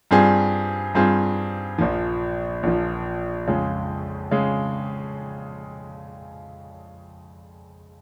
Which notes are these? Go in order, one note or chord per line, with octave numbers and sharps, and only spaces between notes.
G2 G3 C4 F4 G#4
G2 G3 C4 F4 G#4
A#1 A#2 F3
A#1 A#2 F3
F2 C#3 G#3
C#3 G#3